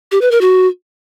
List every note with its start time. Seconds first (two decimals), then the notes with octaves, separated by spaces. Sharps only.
0.12 G4
0.21 B4
0.31 A#4
0.41 F#4